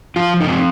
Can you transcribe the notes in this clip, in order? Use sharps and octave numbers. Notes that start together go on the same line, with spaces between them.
F3 F4
D#4
C4